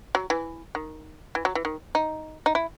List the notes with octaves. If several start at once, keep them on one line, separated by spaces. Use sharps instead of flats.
F#3
E3
D#3
E3
F#3
E3
D#3
D#4
D#4
E4